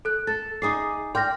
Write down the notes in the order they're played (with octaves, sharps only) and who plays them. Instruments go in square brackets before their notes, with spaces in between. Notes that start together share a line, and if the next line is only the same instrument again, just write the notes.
[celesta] A4 F#6
[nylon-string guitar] A4 [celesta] A6
[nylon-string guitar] D#4 G#4 D5 [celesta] D6 D#6 C7
[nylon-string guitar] D5 G5 [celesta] C6 F6 A#6